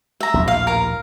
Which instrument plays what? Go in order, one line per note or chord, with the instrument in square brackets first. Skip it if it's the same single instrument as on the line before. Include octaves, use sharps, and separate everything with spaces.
[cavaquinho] E5 A#5
[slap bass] A#1 D#2 A2
[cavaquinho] F5
A#4 F5